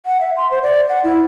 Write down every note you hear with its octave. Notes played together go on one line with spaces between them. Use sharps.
F#5
E5
C6
C5
D5
F#5
E4